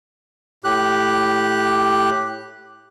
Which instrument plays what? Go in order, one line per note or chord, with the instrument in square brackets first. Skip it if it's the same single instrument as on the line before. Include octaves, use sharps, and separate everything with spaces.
[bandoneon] A2 G4 F#6